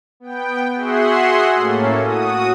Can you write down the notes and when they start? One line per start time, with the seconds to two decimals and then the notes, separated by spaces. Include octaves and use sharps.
0.20 B3 G5
0.75 F#4 G#4 E5 F#5 C6
1.55 A2 A#3 C#4 A4
2.00 F#4 D#6